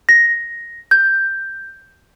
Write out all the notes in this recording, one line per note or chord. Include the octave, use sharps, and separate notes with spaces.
A#6
G6